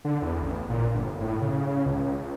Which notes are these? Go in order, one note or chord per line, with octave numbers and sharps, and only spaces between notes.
D3
E2
A1
A#2
G1
A2
C#3
C#2